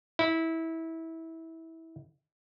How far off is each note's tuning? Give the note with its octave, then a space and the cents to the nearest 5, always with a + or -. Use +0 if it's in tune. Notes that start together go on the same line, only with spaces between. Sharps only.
E4 -20